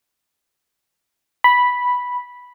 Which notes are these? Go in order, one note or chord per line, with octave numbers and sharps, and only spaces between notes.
B5